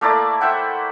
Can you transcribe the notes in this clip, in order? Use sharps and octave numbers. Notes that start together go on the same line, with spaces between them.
A3 A#3 E4 D5
C5 E5 F#5 G5